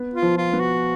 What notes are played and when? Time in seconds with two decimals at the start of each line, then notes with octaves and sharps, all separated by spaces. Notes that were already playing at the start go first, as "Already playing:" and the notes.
Already playing: B3
0.14 F4
0.22 F3
0.37 F4
0.53 B3
0.60 F#4